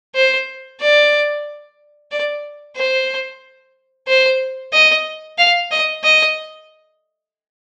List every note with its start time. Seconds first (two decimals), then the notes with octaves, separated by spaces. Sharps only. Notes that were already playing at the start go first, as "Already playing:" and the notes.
0.15 C5
0.81 D5
2.12 D5
2.76 C5
4.08 C5
4.73 D#5
5.38 F5
5.71 D#5
6.04 D#5